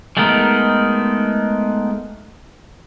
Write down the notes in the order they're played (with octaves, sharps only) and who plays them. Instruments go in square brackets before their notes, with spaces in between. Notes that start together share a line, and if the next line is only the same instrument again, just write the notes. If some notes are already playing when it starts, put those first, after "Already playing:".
[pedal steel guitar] G#3 A3 B3 D#4 A#4